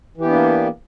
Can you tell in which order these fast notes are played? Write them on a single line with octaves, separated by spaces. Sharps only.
E3 G4 B3 D4 A#3